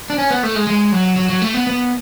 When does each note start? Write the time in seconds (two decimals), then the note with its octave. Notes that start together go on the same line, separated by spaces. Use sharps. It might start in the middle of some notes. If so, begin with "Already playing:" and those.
0.10 D4
0.18 C#4
0.30 B3
0.43 A3
0.56 G#3
0.67 G#3
0.92 F#3
1.16 F#3
1.29 F#3
1.42 A3
1.54 B3
1.67 B3